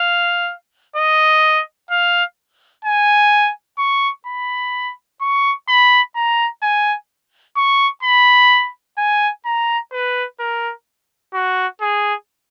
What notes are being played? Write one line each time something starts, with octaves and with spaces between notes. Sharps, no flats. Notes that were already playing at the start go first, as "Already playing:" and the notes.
Already playing: F5
D#5
F5
G#5
C#6
B5
C#6
B5
A#5
G#5
C#6
B5
G#5
A#5
B4
A#4
F#4
G#4